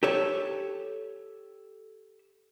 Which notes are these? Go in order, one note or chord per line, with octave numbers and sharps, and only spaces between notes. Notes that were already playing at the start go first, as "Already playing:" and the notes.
G4 A4 C#5